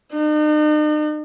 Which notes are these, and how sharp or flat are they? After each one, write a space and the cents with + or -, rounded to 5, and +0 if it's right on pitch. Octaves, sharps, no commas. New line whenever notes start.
D#4 -45